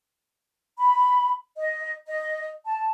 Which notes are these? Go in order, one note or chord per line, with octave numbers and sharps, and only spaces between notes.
B5
D#5
D#5
A5